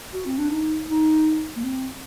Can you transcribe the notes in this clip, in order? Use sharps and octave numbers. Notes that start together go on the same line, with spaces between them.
F#4
C4
D4
D#4
D#4
A#3
C4